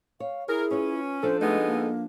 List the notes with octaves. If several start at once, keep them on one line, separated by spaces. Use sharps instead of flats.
C#5 F5
E4 G#4 A#4
C#4 F4 B4 C#5
F3 D4 F4 A4 C5
G#3 A3 B3 D#4
A#3